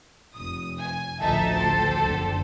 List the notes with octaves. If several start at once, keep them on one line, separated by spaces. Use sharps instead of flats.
F1 D#6
G#5
A1 D2 F3 D#4 A4 E5 A5
G4 A4 C5
F#1 F2 D3